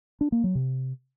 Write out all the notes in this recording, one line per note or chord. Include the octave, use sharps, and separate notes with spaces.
D4
A#3
F#3
C3